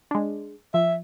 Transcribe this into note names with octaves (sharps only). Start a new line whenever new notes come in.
G#3 D4
F3 E5